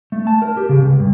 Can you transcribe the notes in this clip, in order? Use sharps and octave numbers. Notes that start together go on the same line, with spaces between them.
A3
A5
A#4
G4
C#3
C#2
G2